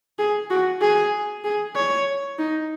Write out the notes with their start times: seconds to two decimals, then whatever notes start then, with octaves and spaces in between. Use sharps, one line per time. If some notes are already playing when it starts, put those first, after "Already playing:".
0.19 G#4
0.50 F#4
0.81 G#4
1.44 G#4
1.76 C#5
2.39 D#4